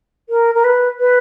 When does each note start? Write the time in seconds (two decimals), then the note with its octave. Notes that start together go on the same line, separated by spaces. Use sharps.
0.29 A#4
0.54 A#4
0.64 B4
0.99 B4